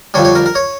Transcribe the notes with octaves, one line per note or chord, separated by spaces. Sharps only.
F2 D3 G3 C#5
C#5
A#4
A#4
C#5